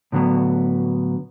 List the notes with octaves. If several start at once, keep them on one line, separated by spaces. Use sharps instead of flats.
A2 D3 F#3 B3